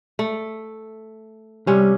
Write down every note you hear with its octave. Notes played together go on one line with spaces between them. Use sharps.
A3
C3 G3 C#4